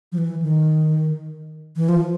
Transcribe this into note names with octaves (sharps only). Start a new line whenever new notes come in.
F3
E3
D#3
E3
F3